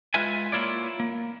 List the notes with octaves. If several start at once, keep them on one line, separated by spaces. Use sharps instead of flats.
G#3 F4 B4 E5 G#5
A#3 E4 F4 C#5 D5
A#3